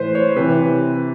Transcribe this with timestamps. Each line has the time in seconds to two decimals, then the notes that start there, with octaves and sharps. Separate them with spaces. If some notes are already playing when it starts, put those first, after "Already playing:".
Already playing: A2 E3 B4 C5
0.15 C#5
0.36 C3 E3 B4